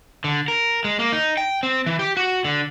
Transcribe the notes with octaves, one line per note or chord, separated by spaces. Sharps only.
D3
A#4
G#3
A#3
D#4
G5
C4
E3
G4
F#4
D3